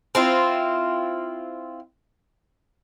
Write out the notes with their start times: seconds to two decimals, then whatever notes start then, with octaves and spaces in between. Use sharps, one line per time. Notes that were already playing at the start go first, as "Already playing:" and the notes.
0.15 C4 E4 F4